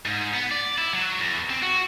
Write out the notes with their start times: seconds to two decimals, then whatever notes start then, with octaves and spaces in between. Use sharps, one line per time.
0.05 G#2
0.34 B3
0.51 D5
0.78 E4
0.93 F#3
1.19 E2
1.50 C4
1.62 F#4